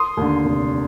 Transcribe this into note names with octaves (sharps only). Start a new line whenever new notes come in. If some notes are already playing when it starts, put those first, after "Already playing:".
Already playing: C6 D#6
D#2 D3
F1